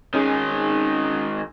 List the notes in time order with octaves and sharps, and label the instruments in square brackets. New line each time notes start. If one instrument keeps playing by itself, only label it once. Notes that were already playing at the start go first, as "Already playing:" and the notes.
[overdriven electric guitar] D#3 G#3 [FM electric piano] C#4 D#4 G#4